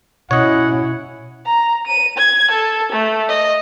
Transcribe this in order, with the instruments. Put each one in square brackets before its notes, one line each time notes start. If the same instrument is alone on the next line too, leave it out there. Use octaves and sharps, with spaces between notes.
[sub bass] B2 [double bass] C#4 E4 [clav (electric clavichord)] C#5 D#5 [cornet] F#5
[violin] A#5
D#7
G#6
A4
A3
D#5